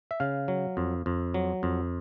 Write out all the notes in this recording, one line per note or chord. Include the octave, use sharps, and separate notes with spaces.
E5
C#3 F5
F#3
F2
F2
F#3
F2